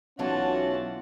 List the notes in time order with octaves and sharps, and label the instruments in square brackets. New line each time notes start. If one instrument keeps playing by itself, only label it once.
[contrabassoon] B1 [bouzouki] E3 D4 F4 [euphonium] C#4 [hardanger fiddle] F#4 A5